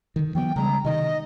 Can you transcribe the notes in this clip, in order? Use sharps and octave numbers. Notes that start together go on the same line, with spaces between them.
D3 D#3
E3 F#3 B3 G5
C#3 G3 G#3 A#5
C3 D#3 D#5